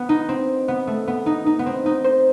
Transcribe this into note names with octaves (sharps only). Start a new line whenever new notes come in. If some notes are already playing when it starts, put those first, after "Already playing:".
Already playing: B3
D#4
C4
B3
A3
B3
D#4
D#4
B3
C4
D#4
C5